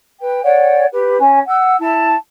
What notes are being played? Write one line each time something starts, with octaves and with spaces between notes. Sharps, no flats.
B4 G5
C#5 D5 F#5 G5
G4 B4
C#4 G#5
F#5 E6
E4 A5